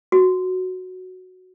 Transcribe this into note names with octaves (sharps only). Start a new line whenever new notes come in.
F#4